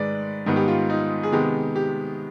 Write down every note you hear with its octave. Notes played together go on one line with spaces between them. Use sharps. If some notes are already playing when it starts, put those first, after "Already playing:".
Already playing: G#2 D#3 G#3 B4 D5
G#2 D#3 G3 B3
G4
F4
D#4
G#4
C3 D#3 G#3 B3 G4
G4